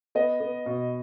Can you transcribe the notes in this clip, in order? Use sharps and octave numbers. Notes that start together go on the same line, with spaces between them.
B3 D#5
B3
B2